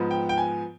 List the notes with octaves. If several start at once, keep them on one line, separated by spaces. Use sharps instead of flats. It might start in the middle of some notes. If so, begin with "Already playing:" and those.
Already playing: G#2 F3 B3
G5
G5
G#5